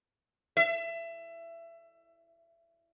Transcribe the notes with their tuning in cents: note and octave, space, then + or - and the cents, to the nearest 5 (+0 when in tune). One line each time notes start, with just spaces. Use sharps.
E5 +25